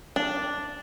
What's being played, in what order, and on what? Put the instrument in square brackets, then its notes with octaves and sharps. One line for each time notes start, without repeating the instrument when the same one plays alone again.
[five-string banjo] D4